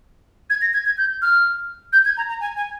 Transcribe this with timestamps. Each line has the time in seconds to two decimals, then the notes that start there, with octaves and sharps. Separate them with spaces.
0.50 G#6
0.61 A#6
0.74 G#6
0.86 G#6
0.98 G6
1.22 F6
1.93 G6
2.05 G#6
2.17 A#5
2.29 A#5
2.40 G#5
2.57 G#5